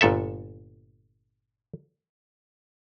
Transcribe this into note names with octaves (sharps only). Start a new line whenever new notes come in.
G1 A#2 A4 E5